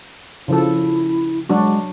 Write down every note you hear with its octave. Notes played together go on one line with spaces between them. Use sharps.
C#3 F3 E4 A4
F#3 G#3 D4 F#4